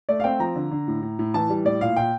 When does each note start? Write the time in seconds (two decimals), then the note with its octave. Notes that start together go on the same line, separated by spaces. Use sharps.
0.09 A3 D5
0.20 F5
0.24 C4 G5
0.40 F3 A#5
0.56 D3
0.71 D3
0.88 A2
1.02 A2
1.19 A2
1.34 E3 A5
1.50 G3
1.65 A2 D5
1.81 A#2 F5
1.96 A#2 G5